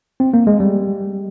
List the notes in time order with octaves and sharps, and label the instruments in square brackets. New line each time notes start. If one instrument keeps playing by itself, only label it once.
[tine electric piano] C4
A#3
G#3
G3